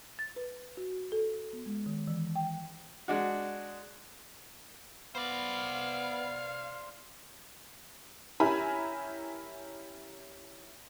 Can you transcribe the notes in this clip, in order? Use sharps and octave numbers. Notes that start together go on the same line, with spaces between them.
A6
B4
F#4
A4
B3
G#3
D#3
E3
G5
G#3 D4 F#4
B3 C5 D5 F5
C#4 E4 G4 A#4 G#5 B5